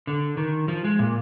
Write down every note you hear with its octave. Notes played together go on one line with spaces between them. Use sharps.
D3
D#3
F3
G#3
A#2